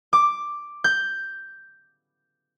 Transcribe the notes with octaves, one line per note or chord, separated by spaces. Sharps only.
D6
G6